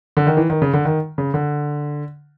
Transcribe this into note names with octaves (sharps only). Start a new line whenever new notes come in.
D3
D#3
E3
D#3
C#3
D3
D#3
C#3
D3